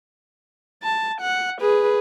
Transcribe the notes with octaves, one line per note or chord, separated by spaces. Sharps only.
A5
F#5
G#4 B4